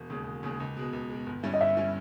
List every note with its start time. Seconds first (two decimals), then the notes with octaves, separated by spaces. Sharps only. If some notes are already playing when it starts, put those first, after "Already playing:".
Already playing: E1
0.10 D#2 C#3 G#3
0.26 E1
0.43 D#2 C#3 G#3
0.60 C#2
0.77 B2 G#3
0.93 C#2
1.10 B2 G#3
1.26 G1
1.43 G2 G3 C#4 E4
1.54 D#5
1.60 G1 E5
1.77 G3 C#4 E4